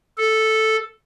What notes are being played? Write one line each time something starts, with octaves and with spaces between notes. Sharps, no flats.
A4